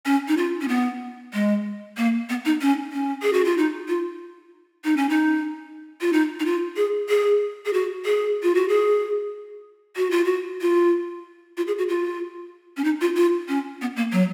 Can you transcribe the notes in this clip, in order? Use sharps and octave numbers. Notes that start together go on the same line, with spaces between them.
C#4
D#4
F4
C#4
B3
G#3
A#3
B3
D#4
C#4
C#4
G#4
F#4
F4
D#4
F4
D#4
C#4
D#4
F4
D#4
D#4
F4
G#4
G#4
G#4
F#4
G#4
F4
F#4
G#4
F#4
F4
F#4
F4
F4
G#4
F#4
F4
C#4
D#4
F4
F4
C#4
B3
A#3
F#3